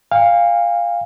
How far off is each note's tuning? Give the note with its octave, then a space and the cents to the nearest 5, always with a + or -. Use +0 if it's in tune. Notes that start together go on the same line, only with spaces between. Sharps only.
F5 +0 G#5 -45